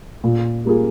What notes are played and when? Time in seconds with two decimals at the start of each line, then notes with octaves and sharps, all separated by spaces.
0.24 A#2
0.65 G3 A#3 F4 G#4